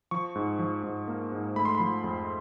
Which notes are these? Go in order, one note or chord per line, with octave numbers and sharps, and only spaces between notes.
F3 C#6
G#2
F3
G#2
A#3
G#2
A3 B5
C6
B5
F3
F2